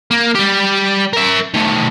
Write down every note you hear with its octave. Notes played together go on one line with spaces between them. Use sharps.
A#3
G3 G4
A#4 E5
D#3 A3